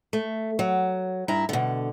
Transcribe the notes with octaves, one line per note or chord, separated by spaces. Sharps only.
A3
F#3
G2 E4 A#5
B2 D3